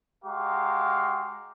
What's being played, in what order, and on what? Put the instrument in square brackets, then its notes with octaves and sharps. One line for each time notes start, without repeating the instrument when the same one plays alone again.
[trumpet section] G#3 F#4 G4 F5 A#5